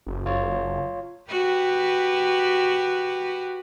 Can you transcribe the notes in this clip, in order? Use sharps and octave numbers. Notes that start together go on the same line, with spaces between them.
F#1
F#1 F4 C#5
F#4 G4 B4